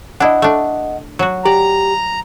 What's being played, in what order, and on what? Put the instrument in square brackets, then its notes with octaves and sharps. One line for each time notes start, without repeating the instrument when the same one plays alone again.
[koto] D4 E4 [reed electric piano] D#5 F#5
[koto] A3 D4
F#3 F#4
[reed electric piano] G4 [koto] D5 [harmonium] A#5